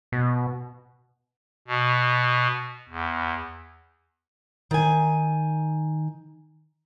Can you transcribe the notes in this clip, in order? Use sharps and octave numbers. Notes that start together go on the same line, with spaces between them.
B2
B2
E2
D#3 G#5